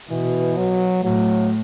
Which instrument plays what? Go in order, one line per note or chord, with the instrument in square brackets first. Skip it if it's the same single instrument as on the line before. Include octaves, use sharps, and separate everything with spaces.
[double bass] B2 [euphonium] E3
[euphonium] F#3
[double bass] A2 [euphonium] F#3